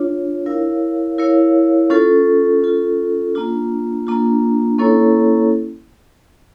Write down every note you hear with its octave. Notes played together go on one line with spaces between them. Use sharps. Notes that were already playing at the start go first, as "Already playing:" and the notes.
Already playing: D4 F4 C#5
E4 A#4 C#5 F5
E4 A#4 C#5 F5
C#4 F4 A4
C#4 F4 A4
A#3 D4 F4
A#3 D4 F4
A#3 C#4 E4 A4 C#5